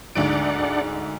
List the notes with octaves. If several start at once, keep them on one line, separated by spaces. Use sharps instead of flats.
D2 G#2 D4 D5 F#5 D7